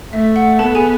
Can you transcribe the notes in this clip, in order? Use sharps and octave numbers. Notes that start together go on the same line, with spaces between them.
A3 E5
F#5
B3 A4 A5
G#4 G#5